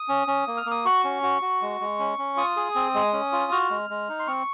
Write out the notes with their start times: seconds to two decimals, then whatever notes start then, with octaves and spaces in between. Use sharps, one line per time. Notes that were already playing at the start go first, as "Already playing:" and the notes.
Already playing: D#6
0.08 C#4
0.27 C#4
0.47 A#3
0.57 F6
0.66 A#3
0.71 D#6
0.85 F#4 C#6
1.04 C#4
1.23 F#4
1.42 F#4
1.62 G#3
1.81 G#3
1.99 C#4
2.19 C#4
2.37 F4 D#6
2.56 G#4
2.75 C4
2.94 G#3
3.13 C#4
3.32 F4
3.52 F#4 F6
3.70 G#3
3.90 G#3
4.09 D#4
4.20 C6
4.27 C4 C#6